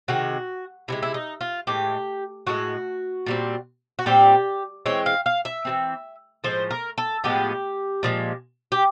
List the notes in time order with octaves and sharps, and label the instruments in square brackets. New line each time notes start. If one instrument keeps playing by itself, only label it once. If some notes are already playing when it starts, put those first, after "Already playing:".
[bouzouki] C3 D#3 G#3 F#4
C3 D#3 G#3 E4
E4
D#4
F4
A2 E3 G#3 G4
A2 E3 G#3 F#4
A#2 G3 C4
F#4
A#2 G3 C4 G4
E3 G#3 C4 C#5
F5
F5
E5
E3 G#3 C4
A2 F3 G#3 C5
A#4
A4
A2 F3 G#3 B3 G4
A#2 F3 G#3
G4